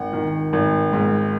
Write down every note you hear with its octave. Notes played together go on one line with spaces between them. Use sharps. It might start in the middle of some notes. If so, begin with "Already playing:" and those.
Already playing: G#1 F#5
D#3
G#1
G#2